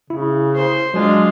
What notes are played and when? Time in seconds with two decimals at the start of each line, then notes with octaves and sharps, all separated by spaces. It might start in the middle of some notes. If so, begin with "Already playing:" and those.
0.10 C#3 E4
0.55 C5
0.94 F#3 G#3 D4 F4 G#5